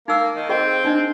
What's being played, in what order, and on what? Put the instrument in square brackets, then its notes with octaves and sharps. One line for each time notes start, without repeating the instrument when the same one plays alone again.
[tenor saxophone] A#3 [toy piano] D#4 E6
[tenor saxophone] D#3
[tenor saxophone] C4 [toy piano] G#4 D#5 G5
[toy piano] D4 D#4 C5